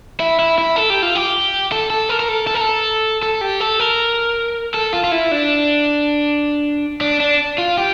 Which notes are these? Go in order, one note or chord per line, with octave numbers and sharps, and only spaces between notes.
E4
E4
E4
A4
G4
F4
G4
A4
A4
A#4
A#4
A4
A4
A#4
A4
A4
G4
A4
A#4
A4
F4
F4
E4
D4
D4
D4
F4
G4